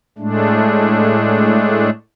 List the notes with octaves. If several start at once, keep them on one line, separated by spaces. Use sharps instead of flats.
A2 G#3 A3 D4